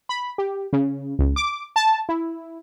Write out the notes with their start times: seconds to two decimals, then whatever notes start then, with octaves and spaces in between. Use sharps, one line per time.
0.09 B5
0.38 G4
0.73 C#3
1.19 C#2
1.36 D6
1.76 A5
2.09 E4